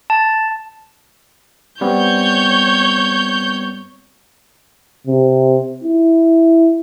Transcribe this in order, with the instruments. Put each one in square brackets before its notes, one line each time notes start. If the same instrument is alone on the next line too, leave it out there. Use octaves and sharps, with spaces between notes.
[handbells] A5
[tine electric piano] G3 B3 C4 [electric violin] C#5 G6
[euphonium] C3
E4